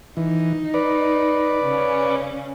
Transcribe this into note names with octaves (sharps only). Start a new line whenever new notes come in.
E3 D#4
B4 D5
C#3 C#4